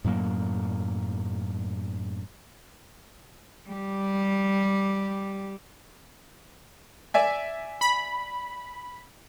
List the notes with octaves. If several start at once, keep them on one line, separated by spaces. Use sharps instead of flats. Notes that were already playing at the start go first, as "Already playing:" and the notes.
F#2 A2 F#3 A#3
G3 G4
D5 E5 G#5
B5